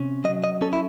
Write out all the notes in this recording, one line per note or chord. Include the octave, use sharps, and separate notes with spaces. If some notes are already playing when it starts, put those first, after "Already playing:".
Already playing: C3 C#4
F#3 D#5
D#5
C#4 A4
E4